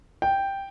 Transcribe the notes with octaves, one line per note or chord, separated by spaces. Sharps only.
G5